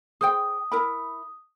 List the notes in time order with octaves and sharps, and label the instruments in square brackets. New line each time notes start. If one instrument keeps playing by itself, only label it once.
[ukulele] G#4 C5 G5 [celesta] D#6
[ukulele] E4 A#4 B5